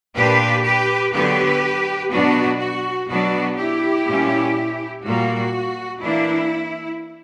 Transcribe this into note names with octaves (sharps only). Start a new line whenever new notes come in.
A#2 A#3 D4 G4 B4
G4 B4
D3 F#3 B3 G4 B4
B2 F#3 B3 D4 F#4
F#4
B2 F#3 B3 D4 F#4
E4 G4
A#2 G3 C#4
A#2 G3 A#3 F#4
E3 A#3 D4 E4